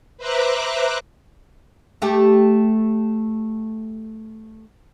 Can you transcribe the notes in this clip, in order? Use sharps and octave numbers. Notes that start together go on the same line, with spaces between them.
B4 C5 E5 A#5 D6 F#6
A3 G4